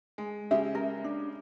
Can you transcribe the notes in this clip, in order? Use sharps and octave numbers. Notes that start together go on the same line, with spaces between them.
G#3
C#3 G#3 G4 E5
A#4
D4